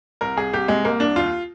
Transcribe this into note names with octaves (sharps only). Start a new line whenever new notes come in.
C2 A#4
C2 G#4
C2 G4
C3 G#3
C2 A#3
C2 D4
D#2 F4